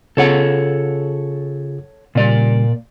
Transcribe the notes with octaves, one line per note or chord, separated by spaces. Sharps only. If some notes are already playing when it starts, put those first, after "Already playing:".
C#3 F4 G#4 A4 C#5 F#5
A#2 C#3 G3 D5